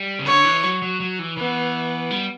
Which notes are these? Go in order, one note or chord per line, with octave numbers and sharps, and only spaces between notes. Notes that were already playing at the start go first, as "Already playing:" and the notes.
Already playing: G3
C#3
D3 C#5
E3
F#3
F#3
F#3
E3
E3 B3
G3